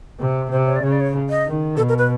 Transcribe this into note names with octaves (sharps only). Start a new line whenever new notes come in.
C3
C3 C5
C#5
D5
C#3 C#5
D5
C#5
D#5
D#3
B2 A4
A#4
B4